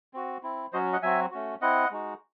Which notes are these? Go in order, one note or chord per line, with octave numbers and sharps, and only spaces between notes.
C4 F#4
C4 E4
F#3 C#4 F#4 C5 D#5
D#5 F#5
F#3 C4 F#4 E5 G#5
A3 C#4 F#4
C4 E4 D#5 F#5
G#3 D#4 F#4